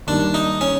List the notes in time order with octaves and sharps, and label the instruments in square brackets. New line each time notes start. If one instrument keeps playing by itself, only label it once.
[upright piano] D#2 D#3 G3 [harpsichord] D4
[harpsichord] D#4
C#4